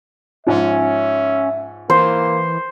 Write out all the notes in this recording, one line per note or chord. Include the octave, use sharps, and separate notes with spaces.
G#2 F3 C#4 E5
E3 A#3 C5